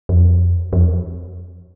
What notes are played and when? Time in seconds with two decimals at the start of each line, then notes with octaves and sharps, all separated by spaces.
0.09 F2
0.73 F2